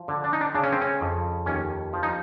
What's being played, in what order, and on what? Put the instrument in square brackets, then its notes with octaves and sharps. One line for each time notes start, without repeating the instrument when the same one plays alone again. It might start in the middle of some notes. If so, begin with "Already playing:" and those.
Already playing: [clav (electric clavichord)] F3
D3
D4
D#4
D4
C#3 D4
C#4
C4
C#4
F2
D#2 C#4
F3
D#4